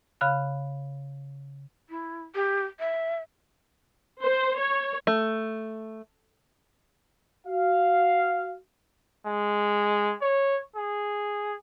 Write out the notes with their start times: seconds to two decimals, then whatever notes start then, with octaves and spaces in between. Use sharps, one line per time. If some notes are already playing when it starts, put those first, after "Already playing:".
0.21 C#3 F5 B5 F#6
1.90 E4
2.35 G4
2.80 E5
4.22 C5
4.58 C#5
5.07 A3
7.47 F#4 F5
9.26 G#3
10.21 C#5
10.76 G#4